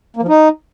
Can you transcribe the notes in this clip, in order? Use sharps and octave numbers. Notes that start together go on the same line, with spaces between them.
A#3
F3
D#4